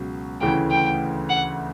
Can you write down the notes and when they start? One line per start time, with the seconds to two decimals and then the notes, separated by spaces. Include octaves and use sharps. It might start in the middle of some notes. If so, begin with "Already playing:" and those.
Already playing: C#2 B2 F#3
0.41 D2 C#3 E3 A3 G5
0.70 G5
1.29 F#5